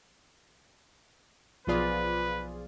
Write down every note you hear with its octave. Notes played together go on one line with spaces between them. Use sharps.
B1 F3 B3 F4 G#4 B4 D5